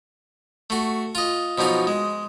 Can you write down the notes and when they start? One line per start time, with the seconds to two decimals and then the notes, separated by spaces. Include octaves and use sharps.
0.70 A3 F#4
1.15 F4 D#5
1.58 B2 F3 F#3 D#4 F#4
1.87 G#3